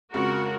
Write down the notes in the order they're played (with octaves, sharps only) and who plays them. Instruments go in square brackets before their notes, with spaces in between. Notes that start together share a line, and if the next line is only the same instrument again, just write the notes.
[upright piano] F2 C#3 G#3 [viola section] F#4 A#4